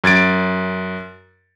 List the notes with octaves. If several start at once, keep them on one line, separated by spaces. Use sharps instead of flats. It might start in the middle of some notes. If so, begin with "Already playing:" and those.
F#2 G#6 A6 D7